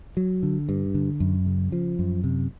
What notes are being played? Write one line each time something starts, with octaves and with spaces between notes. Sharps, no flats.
F#3
D3
G2
D3
F#2
C#3
F3
F#2
C3